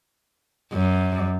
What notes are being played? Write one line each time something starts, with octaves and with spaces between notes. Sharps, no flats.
F#2